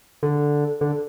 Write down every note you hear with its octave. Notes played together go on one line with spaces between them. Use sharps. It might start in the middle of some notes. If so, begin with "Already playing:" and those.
D3
D3